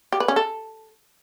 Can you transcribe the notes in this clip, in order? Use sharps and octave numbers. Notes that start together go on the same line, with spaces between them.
G4
B4
C#4
A4